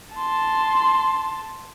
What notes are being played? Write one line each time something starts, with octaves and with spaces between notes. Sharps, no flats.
A5 C6